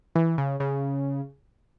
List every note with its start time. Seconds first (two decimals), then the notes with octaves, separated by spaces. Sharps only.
0.15 E3
0.38 C#3
0.60 C#3